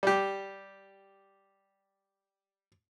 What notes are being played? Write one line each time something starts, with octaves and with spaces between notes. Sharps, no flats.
G3 G4